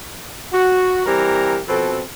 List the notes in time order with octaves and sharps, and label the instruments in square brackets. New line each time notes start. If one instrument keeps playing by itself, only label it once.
[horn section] F#4
E3 G3 C4 G4 A#4 A#5
B2 F3 C4 A4